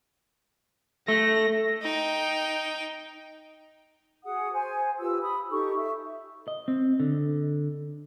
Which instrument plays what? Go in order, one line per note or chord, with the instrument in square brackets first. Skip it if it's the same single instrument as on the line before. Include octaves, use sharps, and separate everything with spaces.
[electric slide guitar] A3 [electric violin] A#6
[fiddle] D#4 G5
[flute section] F#4 G#4 F#5 D#6
C5 G#5
F4 G4 B4 E6
B5 D#6
D#4 G4 A4 C#6
E5
[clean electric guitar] D#5
C4
D3